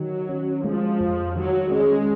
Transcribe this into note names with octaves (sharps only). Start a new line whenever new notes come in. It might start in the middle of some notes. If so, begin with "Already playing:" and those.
Already playing: D#3 F#3
C#4
F3 G#3
F2
D#3 F#3
G#3 C#4